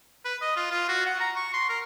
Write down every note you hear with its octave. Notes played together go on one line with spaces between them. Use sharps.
B4
D#5
F4
F4
F#4
F#5
A#5
C#6
C6
A#4